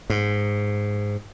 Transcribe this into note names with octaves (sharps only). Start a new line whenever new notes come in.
G#2